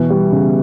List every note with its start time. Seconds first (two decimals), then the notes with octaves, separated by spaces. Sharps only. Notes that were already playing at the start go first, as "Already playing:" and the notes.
Already playing: B2 E3
0.10 G3
0.32 C#3